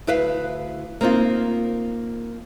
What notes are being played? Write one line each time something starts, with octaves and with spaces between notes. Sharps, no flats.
D2 E4 B4 F5
A#3 C4 D#4 F4